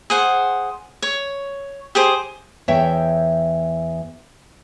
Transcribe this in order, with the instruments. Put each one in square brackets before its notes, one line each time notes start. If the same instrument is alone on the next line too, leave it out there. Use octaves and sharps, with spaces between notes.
[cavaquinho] G#4 C5 F#5
C#5
G4 G#4 C5
[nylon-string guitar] E2 C#5 E5 G5